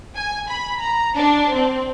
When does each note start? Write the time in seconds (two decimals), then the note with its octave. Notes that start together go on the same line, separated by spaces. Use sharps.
0.15 G#5
0.49 B5
0.80 A#5
1.17 D4
1.53 C4